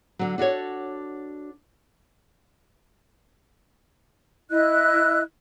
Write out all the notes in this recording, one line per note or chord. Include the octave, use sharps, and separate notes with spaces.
D3 F#3
D4 F#4 A4 C#5
E4 D#5 F#6